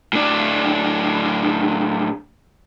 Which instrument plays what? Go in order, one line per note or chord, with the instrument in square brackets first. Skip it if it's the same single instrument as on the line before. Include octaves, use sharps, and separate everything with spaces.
[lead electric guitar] A2 D4